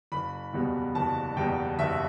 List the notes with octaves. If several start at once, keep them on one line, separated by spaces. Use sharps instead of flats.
F#1 B5
E2 B2 G3
F#1 A5
E2 B2 G3 G5
F#1 E5